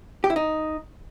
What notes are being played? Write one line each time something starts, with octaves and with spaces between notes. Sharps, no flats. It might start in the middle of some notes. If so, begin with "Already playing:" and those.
G4
E4
D#4